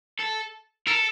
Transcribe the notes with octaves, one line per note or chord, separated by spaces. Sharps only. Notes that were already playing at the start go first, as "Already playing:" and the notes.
A4
A4 A#4